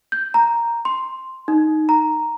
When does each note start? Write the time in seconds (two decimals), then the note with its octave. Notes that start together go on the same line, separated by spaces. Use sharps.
0.12 G6
0.34 A#5
0.85 C6
1.48 D#4
1.89 A#5